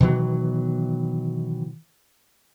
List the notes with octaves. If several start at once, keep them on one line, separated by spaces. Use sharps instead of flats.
B2 D#3 E3 F#3